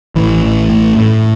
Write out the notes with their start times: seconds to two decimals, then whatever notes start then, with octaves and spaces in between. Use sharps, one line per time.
0.15 A1 E3
0.43 A1
0.69 A2
0.96 A2